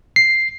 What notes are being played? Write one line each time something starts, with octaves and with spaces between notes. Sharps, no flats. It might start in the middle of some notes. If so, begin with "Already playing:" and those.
C7